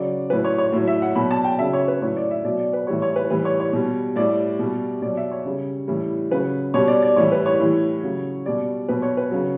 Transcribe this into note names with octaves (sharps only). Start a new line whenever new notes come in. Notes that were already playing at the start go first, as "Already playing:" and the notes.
Already playing: C#3 F#3 D5
A2 F#3 B4
C#5
C#5
A2 F#3
E5
F#5
B2 F#3 B5
A5
G5
C#3 F#3 E5
C#5
B4
A2 F#3 C#5
D5
E5
B2 F#3 D5
D5
B4
A2 E3 G3 C#5
C#5
B4
A2 E3 G3 B4
C#5
C#5
B2 G3
A2 G3 D5
B2 G3
B2 F#3 D5
E5
C#5
C#3 G3
A2 E3 G3
C#3 F#3 B4
B2 G3 C#5
D5
D5
A2 E3 G3 C#5
B4
C#5
A2 E3 G3
C#3 F#3
B2 G3 D5
B2 F#3 B4
C#5
B4
C#3 F#3